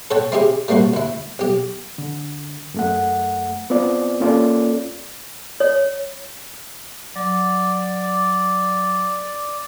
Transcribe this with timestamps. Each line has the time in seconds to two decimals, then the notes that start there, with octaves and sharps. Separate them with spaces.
0.11 A4 C5 C#5 F#5 G5 A5
0.32 C4 D#4 E4 G4 G#4 C5
0.68 G3 A3 A#3 C4 F#4
0.94 D2 E4
1.39 B1 G4
1.98 D3
2.74 F#2 A3 F#5
3.70 B3 C4 F4 D5
4.20 A#3 C#4 F4 A4 D5
5.60 C#5
7.15 F#3 D5